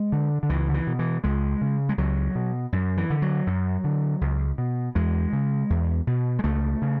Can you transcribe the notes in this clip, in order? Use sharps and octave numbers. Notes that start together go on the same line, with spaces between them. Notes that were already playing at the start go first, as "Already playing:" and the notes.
Already playing: G#3
D3
D3
C#2 E3
D3
E3
B2
E3
C#2 G#3
C#3
G#3
C#2 F#3
B2
F#2
E3
D3
F#3
F#2
D3
C#2
B2
E2 G#3
C#3
E2
B2
G#3
C#2 A3
C#3